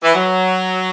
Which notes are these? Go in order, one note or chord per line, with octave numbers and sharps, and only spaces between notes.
E3
F#3